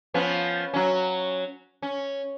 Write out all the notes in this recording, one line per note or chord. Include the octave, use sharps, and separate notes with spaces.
F3 B3 C#4
F#3 C#4
C#4